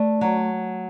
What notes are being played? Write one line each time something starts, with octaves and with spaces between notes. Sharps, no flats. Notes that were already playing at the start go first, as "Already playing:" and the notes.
Already playing: A3 D4
F#3